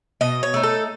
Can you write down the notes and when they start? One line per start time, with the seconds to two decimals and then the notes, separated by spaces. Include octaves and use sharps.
0.21 B2 D#5
0.43 C#5
0.54 A3 D#4
0.63 A4